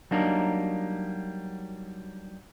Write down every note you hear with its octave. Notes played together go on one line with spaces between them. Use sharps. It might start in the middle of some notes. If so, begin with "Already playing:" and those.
F#3 G3 A#3 D4 D#4